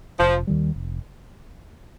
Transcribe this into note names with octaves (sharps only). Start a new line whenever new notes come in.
F1 F3
D#2 D#3 G3
F1